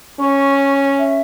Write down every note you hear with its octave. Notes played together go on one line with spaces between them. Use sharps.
C#4 C#6
E5